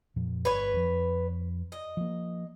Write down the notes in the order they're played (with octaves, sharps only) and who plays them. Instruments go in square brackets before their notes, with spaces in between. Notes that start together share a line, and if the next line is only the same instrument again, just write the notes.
[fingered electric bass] F2 A#2 F3
[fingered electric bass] G1 [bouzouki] B4 C#5
[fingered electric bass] F2 F3
[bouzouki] D#5
[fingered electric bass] F3 A#3